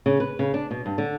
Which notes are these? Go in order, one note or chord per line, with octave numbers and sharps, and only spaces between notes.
C#3
B4
C#3
D4
B2
G2
D3